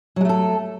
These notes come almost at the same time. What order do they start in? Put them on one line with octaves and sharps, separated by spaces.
F#3 G#3 A3 A4